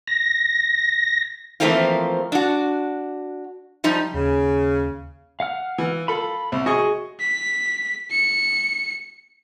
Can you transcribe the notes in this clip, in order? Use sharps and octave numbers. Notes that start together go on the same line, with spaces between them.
A#6
E3 F3 A3 A#3 C4 F4
D4 F#4
F3 G3 D#4
D#2 C#3
F5 F#5 F6
E3
F4 A4 B5
C2
F#4 G#4 D#5 G#5 C#6
B6
C#7